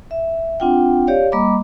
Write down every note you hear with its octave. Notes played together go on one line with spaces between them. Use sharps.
E5
C4 D4 F4 F#5 G5
G4 C#5 D5 F5
G3 A#3 D#5 A#5 B5 D6